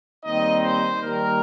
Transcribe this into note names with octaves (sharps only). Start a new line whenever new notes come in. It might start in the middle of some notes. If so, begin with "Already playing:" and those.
D#2 D#3 G3 C4 D#4 D#5
C5
D#2 D#3 G3 A#4